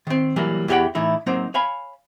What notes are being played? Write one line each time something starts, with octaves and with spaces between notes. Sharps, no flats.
D#3 C4
E3 F#3 G3 A#3
E2 E3 G4 C#5 F#5 G5
A2 E3 D#4 E4
F#3 A#3 C4 D#4 C5
C#5 F5 G#5 B5